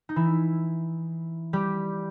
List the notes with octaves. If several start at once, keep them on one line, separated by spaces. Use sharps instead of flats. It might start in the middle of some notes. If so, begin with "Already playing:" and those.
D#4
E3 E4
G3 G4